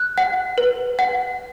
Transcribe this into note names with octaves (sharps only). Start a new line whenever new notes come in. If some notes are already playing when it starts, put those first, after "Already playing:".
Already playing: F#6
F#5
B4
F#5